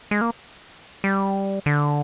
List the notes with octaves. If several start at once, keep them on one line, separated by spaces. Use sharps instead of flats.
G#3
A#3
G3
D3